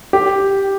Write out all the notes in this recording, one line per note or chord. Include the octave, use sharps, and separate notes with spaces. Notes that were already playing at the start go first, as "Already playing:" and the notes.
G4